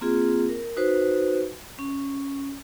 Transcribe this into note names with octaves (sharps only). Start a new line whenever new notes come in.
A#3 C4 F4 G#4
A#4
D#4 F#4 B4 C5
C#4